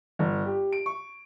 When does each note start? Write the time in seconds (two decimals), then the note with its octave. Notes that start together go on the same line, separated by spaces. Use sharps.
0.19 G1
0.46 G4
0.73 D7
0.86 C#6